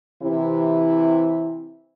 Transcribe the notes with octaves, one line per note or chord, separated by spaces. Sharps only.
C3 E3 E4